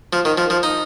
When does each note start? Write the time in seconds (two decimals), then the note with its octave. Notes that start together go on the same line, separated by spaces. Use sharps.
0.13 F3
0.25 D#3
0.38 F3
0.50 F3
0.63 D#4